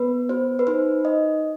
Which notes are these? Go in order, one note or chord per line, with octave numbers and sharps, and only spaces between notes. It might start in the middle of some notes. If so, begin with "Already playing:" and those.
Already playing: B3 B4
F#4 C5
B4
D#4 C5
D#4 D#5